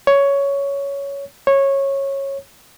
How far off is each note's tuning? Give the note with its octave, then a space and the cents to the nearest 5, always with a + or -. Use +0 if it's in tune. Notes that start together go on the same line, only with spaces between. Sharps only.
C#5 +10
C#5 -15